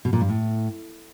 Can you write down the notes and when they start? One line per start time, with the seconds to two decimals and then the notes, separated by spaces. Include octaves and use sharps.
0.05 B2
0.13 A#2
0.21 G2
0.29 A2